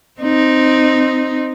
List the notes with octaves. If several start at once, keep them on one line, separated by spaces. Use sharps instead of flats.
C4 D#4